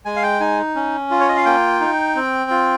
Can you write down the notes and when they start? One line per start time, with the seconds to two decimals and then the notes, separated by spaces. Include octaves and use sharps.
0.05 G#3 G#5
0.16 F5
0.23 G5
0.40 D#4 G#5
0.75 C#4
1.11 F4
1.20 C#5
1.29 D#5
1.37 F5
1.45 A#3 G5
1.81 D#4
2.15 C4
2.50 F4